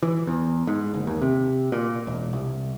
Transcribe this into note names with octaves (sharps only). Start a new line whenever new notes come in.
E3
E2
G#2
F#1
D#2
C3
A#2
E1
C2